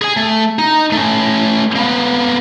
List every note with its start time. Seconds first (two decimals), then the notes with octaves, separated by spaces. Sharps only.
0.02 G#4 G#5
0.17 A3
0.59 D#4
0.93 A3 C#4
1.76 A#3 B3